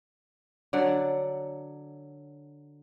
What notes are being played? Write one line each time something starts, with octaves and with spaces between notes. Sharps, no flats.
D3 F#3 D5 F#5